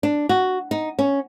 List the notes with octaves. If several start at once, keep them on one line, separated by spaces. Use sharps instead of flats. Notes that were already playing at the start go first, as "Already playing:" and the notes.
D4
F#4
D#4
C#4